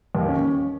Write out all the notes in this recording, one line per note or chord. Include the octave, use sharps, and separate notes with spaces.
D#2
C#4